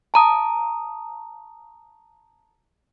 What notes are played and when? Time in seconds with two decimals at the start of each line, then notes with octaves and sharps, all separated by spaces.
0.14 A5 A#5 D#6